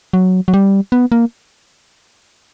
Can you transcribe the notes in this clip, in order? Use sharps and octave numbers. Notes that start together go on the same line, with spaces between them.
F#3
F#3
G3
B3
A#3